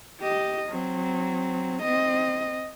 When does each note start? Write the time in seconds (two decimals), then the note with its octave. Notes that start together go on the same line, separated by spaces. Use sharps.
0.21 G4 D#5
0.70 F#3 C4
1.82 C4 D#5